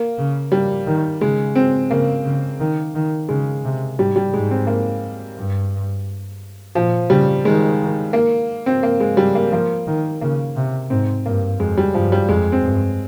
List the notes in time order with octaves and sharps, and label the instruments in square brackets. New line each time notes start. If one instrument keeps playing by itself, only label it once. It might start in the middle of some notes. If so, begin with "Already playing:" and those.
Already playing: [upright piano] A#3
[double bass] C#3
[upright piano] G3
[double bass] D#3
[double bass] C#3 [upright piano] G#3
[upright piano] C4
[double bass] C#3 [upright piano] A#3
[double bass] C#3
D#3
D#3
[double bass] C#3 [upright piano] G#3
[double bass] C3
[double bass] G#2 [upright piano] G3
[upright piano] G3
[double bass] G#2 [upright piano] G#3
[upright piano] C4
A#3
[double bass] G2
[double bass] A#2 [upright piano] F3
[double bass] C#3 [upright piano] G3
[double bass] D#3 [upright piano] G#3
[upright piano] A#3
C4
A#3
G#3
G3
A#3
[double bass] F3 [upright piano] A#3
[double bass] D#3
[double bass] C#3 [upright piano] A#3
[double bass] C3
[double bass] G#2 [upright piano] C4
[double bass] G2 [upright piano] A#3
[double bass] F2 [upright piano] G#3
[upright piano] G3
[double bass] G2 [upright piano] F3
[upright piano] G3
[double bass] F2 [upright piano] G#3
[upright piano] C4
[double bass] G2